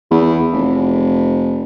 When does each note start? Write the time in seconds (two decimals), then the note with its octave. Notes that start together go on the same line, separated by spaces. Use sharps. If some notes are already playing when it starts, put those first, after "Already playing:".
0.11 E2
0.53 F1